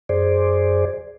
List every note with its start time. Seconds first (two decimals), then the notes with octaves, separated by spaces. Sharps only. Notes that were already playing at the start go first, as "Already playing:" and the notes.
0.09 F#2 G#4 C5 D5